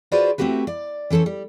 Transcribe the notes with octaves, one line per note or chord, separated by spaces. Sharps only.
F4 F#4 G#4 B4 C5 D5
A3 C4 E4 F#4 G4 B4
D5
E3 C#4 A4 C5 C#5
G3